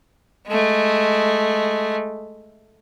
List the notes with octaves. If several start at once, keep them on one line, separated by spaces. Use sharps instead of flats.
G#3 A3